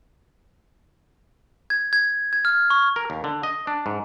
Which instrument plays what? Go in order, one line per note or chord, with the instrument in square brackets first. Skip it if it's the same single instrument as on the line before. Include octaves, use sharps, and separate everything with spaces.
[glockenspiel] G#6
G#6
G#6
F6
C#6
[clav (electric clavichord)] A#4
D#2
D3
D#5
D4
G#2